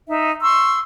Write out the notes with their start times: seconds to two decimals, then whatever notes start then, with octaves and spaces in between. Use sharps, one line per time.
0.08 D#4 E5
0.42 C6 C#6 E6